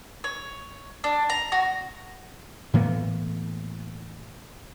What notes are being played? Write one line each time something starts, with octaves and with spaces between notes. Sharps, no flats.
C#5
D4
A#5
F#4
A2 E3 A#3 B3